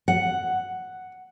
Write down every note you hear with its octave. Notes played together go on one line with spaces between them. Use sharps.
F#5